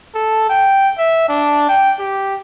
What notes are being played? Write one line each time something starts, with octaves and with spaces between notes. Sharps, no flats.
A4
G5
E5
D4
G5
G4